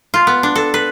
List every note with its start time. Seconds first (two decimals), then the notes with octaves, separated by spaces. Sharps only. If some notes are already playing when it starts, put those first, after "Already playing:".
0.14 F4
0.27 B3
0.43 D4
0.56 A4
0.74 B4